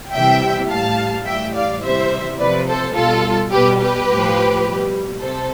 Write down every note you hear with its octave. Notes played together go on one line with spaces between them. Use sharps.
C3 E3 G3 E5 G5
A2 G3 F5 A5
A2 E3 G3 E5 G5
D5 F5
C3 E3 G3 C5 E5
C3 F3 B4 D5
A4 C5
B2 G3 F4 A4
B2 G3 G4 B4
G4 B4
A2 F3
B2 G3
C3 A4 C5